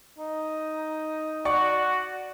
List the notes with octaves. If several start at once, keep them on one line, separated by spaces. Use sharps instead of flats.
D#4
F#4 D5 C#6